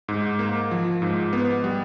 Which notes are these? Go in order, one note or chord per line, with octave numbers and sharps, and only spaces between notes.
G#2
A#3
F3
G#2
B3
G3